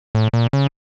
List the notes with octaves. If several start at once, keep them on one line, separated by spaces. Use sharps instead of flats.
A2
A#2
C#3